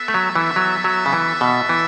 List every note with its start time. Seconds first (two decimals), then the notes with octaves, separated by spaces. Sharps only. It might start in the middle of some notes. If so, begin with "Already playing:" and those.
Already playing: B3 A4 E5
0.08 A3
0.14 F#3
0.36 E3
0.56 F#3
0.84 F#3
1.06 C#3
1.13 E3
1.41 B2
1.69 E3